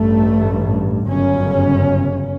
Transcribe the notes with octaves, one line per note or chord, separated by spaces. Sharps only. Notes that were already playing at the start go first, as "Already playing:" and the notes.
Already playing: A1 G2 A3
G1 F#2 C#3 C#4